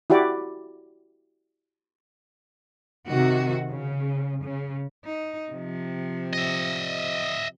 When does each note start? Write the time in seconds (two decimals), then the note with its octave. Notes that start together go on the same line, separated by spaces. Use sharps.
0.10 E4 F#4 G4 D5
3.09 C3 D#3 F#4
3.70 C#3
4.43 C#3
5.05 D#4
5.51 C3 F3
6.33 D#5 E5